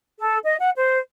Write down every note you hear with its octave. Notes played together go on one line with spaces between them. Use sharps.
A4
D#5
F#5
C5